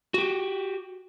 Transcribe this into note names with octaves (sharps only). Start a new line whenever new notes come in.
F#4 G4